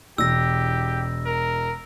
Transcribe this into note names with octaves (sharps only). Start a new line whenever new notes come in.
E1 G4 E6 A#6
A#4